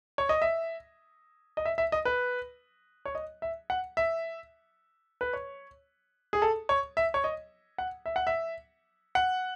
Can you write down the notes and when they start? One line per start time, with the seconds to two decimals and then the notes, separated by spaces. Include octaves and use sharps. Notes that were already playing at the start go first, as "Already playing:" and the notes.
0.18 C#5
0.29 D#5
0.42 E5
1.57 D#5
1.65 E5
1.78 E5
1.92 D#5
2.05 B4
3.05 C#5
3.15 D#5
3.42 E5
3.70 F#5
3.97 E5
5.21 B4
5.33 C#5
6.33 G#4
6.42 A4
6.69 C#5
6.97 E5
7.14 C#5
7.24 D#5
7.78 F#5
8.06 E5
8.16 F#5
8.27 E5
9.15 F#5